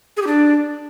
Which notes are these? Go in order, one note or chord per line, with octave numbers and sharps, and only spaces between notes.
G#4
G4
D4